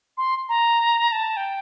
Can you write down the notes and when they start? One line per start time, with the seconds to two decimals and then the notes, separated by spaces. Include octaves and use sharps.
0.17 C6
0.49 A#5
1.12 A5
1.37 G5